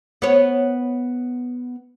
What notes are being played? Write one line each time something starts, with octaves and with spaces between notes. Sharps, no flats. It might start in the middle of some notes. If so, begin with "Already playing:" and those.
B3 C#5